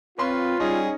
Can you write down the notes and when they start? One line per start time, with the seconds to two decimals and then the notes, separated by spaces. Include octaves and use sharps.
0.19 C4 F4 B4 C#5 C6
0.60 G3 C#4 D#4 G#4